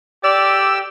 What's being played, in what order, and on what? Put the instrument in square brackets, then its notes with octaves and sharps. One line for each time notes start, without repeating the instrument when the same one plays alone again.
[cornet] G4 [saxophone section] D5 [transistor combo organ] E6